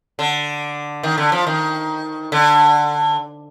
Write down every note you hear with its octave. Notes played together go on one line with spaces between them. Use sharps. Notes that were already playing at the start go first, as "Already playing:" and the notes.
D3
D#3
D3
F3
D#3
D3